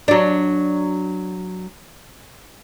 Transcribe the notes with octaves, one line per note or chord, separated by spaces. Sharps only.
F#3 D4